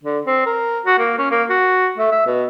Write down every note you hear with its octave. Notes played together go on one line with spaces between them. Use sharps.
D3
C4
A#4
F#4
A#3
C#4
A#3
F#4
A3
E5
B2